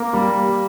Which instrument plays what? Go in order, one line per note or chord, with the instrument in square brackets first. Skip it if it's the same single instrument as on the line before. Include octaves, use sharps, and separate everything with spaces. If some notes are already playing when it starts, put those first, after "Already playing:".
Already playing: [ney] A#3
[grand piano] G3